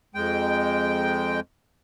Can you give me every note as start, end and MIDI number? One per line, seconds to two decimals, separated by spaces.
0.15 1.40 41
0.15 1.40 56
0.15 1.40 79